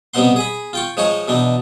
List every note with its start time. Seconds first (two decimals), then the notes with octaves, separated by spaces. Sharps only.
0.14 C3 G3 B3 D#4 F#5 C6
0.36 G#4 G#5 B5
0.73 F4 G5 C#6
0.97 F3 G#3 D#4 C#5 D#5 C#6
1.28 B2 E3 D4 D#4